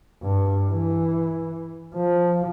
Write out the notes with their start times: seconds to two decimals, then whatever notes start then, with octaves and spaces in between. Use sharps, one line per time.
0.22 G2
0.71 E3
1.95 F3